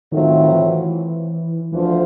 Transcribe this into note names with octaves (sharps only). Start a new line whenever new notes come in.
A2 D#3 F#3 A3 C4 F4
E3
D2 D3 E3 F3